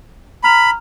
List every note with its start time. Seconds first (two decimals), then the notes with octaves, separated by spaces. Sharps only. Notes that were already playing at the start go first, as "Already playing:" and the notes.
0.44 A#5 B5 F6 F7